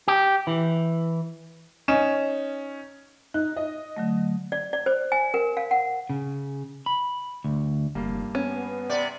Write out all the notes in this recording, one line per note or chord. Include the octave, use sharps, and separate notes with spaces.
G4
E3
C#4 D#4 E7
D#4 F#6
D#5
D3 F#3 A3
D5
D5
C5
G#5
A#4
F5
F#5
C#3
B5
D2
F1 G2 A#3
B3 C#4
C3 D5